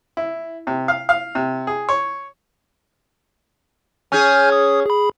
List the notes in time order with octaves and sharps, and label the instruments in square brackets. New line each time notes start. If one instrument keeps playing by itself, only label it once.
[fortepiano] E4
C3
F5
F5
C3
G#4
C#5
[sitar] C#4 G#4 [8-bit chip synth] G#5 F6 G6
[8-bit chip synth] D#6
G#4 B5